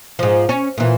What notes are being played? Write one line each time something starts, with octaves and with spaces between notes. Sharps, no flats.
G#2 F3
C#4
A#2 E3